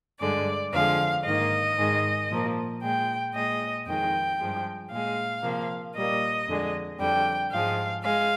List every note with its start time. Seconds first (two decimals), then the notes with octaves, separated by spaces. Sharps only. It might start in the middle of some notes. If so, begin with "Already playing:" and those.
0.20 G2 D3 G#3 D5
0.72 F2 D3 F3 G#3 F5
1.25 G#2 D#3 A#3 D#5
1.77 G#2 D#3 G#3
2.30 A#2 F3 A#3
2.82 A#2 G#3 G5
3.34 A#2 G#3 D#5
3.87 F2 D#3 G#3 G5
4.39 G2 F3 G#3
4.91 A#2 G#3 F5
5.43 C3 F3 A#3
5.95 A#2 G3 A#3 D#5
6.48 F2 D3 G#3
6.99 F2 D3 G3 G5
7.51 G#2 F3 G#3 F5
8.04 G#3 F5